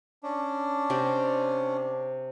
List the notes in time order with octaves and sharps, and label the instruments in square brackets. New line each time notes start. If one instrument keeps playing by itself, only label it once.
[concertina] C#4 D4
[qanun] C3 C5 D5